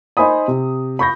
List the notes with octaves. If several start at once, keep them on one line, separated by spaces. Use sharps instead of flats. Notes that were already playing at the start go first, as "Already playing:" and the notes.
D#4 C5 G#5 B5 D#6
C3
B5 C#6 G6 A#6